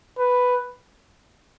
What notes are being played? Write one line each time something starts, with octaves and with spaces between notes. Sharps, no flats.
B4